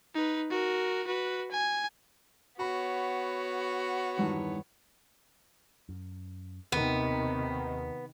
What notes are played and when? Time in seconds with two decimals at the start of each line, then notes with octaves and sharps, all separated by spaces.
0.15 D#4 B4
0.50 F#4 A#4
1.07 F#4 B4
1.51 G#5
2.60 B3 F#4 C#5 B5
4.17 E2 G2 D#3
5.89 F#2
6.72 D#2 C3 D#3 B3